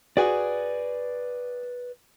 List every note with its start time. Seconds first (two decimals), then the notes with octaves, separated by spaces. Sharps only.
0.17 F#4 G#4 B4 D5